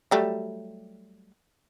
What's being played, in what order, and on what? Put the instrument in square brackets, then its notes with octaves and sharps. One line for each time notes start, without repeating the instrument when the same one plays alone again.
[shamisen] F#3 G3 A3